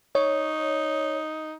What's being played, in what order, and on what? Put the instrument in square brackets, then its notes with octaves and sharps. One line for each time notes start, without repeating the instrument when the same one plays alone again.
[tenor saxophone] D#4 [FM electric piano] C#5